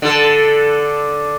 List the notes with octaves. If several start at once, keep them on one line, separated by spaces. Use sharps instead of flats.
D3 A4